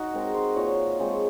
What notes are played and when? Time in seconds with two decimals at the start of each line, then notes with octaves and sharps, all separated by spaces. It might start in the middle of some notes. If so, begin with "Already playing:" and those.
Already playing: D#4 F#4
0.13 G#3 C4 A#4
0.34 C5
0.56 A#2 C#5
0.99 F3 G#3 C4